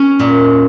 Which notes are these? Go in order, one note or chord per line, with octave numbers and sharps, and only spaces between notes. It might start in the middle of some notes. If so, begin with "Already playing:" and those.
Already playing: C#4
A#2